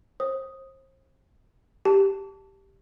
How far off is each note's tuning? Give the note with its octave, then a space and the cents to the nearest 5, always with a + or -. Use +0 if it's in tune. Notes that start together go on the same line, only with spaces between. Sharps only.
C5 +35 D#6 +0
G4 +0 A5 +5